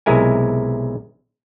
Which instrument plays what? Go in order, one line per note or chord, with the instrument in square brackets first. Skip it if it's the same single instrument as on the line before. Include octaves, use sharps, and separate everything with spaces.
[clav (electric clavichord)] B1 C3 G#3 E4 A#4 G#5